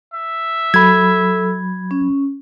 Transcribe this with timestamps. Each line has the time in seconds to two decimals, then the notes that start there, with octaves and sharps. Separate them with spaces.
0.14 E5
0.74 F#3 A4 B5 G#6
1.91 C#4